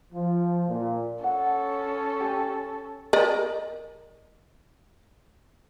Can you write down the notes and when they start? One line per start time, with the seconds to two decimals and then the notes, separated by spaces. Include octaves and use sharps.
0.13 F3
0.68 A#2
1.24 C#4 A4 F#5
2.20 G4 G#5
3.13 A#4 D5 D#5